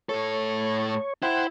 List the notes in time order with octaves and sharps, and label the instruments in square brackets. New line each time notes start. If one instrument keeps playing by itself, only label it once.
[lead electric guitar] A2 A4 [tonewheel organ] C#5
[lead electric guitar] E4 [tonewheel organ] C5 F#5 G5